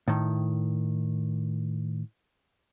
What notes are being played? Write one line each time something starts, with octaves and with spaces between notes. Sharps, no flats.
A2 D#3